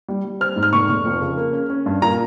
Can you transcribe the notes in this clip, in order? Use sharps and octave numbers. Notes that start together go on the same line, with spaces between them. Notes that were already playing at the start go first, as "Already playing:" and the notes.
G3
G3
C4 F6
G#2
F6
F1 C#6
F1
F2
C#3
A#3
C#4
C#4
G2
A#2 A#5